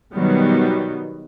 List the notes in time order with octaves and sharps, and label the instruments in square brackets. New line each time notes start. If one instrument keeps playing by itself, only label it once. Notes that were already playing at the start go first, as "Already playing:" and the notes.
[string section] B2 D#3 F#3 G3 B3